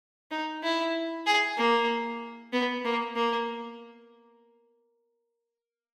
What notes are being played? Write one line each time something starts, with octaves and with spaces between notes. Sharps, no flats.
D#4
E4
G#4
A#3
B3
A#3
A#3